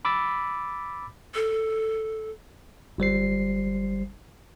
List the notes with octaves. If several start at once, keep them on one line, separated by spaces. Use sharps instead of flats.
B5 D6 E6 A6 B6
A4
G1 G3 C5 C7